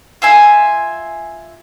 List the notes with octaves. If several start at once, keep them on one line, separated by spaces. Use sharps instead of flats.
F4 E5 G#5